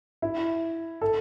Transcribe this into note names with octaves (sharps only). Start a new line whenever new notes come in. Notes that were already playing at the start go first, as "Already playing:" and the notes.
E4
A4